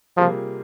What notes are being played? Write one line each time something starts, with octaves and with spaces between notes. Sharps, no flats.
C3 F3 G3 A#3 F4 G#4